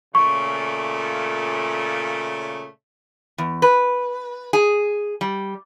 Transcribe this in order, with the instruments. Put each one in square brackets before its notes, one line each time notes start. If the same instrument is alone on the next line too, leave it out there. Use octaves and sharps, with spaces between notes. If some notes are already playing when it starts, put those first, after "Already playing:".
[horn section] A#2 C#3 A3 [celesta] C#6
[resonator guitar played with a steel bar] E2
B4
G#4
G3